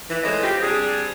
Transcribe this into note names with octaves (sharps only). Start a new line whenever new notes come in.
E3
E3 G#3 A3 C5 C#5 D#5
C4 F4 G4
C3 G3 C4 D4 G#4